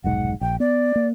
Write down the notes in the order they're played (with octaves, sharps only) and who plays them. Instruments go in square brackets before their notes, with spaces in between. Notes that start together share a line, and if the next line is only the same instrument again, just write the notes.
[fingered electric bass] F1 B1 G#2 [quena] F#5
[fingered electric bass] A#1 [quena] G5
[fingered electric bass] B3 [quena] D5
[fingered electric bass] A#3